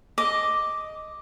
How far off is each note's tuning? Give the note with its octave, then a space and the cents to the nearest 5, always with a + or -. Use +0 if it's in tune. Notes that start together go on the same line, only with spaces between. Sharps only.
D#5 +0 D6 +0